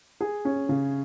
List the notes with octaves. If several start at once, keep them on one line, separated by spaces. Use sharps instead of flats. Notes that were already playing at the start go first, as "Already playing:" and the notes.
G#4
C#4
C#3